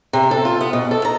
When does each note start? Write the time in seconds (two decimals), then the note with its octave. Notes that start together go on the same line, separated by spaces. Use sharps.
0.13 C3
0.31 A4
0.45 F4
0.61 B3
0.73 B2
0.91 A4
1.05 A#5